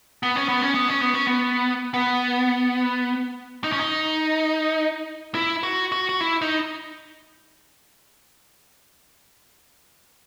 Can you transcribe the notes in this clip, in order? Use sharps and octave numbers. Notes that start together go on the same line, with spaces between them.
B3
C#4
B3
C#4
B3
C#4
B3
C#4
B3
B3
D#4
C#4
D#4
E4
F#4
F#4
F#4
E4
D#4